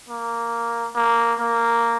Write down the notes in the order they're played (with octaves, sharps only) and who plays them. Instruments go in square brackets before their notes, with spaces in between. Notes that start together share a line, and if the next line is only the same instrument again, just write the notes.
[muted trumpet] A#3
A#3
A#3